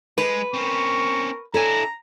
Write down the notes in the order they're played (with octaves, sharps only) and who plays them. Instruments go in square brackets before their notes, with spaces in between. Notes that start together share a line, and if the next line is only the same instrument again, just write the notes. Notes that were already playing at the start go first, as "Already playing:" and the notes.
[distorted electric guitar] G#3 [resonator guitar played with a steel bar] B4
[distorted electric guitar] C4 C#4 [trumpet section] A#4 C#6
[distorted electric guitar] D4 E4 [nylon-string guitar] A4 C#5 G#5 [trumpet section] A#5